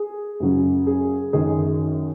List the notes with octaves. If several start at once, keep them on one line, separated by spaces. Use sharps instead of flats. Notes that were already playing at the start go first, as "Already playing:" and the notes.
Already playing: G#4
F#2 C#3 F#3 C#4
G#4
F#2 D#3 G#3 C#4 G#4